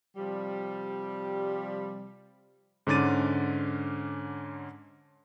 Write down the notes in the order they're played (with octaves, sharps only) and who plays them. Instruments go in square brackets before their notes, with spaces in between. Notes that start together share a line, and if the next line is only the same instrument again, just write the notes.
[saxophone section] C3 F3 G3
[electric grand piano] G#2 D3 C#4 D6 A6 D#7